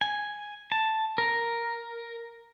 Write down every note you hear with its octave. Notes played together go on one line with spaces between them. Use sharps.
G#5
A5
A#4